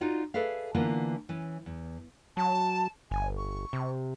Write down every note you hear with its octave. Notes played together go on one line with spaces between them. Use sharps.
D#4 F4 F#4 D5
G#4 A4 B4 D5 E5 F5
D3 E3 A#3 B3 F4 A#4
E3 C#4
E2
F#3 A5
G1 G#5
C#6
C3